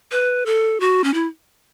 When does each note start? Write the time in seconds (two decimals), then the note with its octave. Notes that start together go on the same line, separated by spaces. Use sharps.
0.12 B4
0.46 A4
0.80 F#4
1.04 C#4
1.14 E4